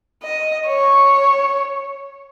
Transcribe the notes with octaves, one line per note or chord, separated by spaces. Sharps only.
D#5
C#5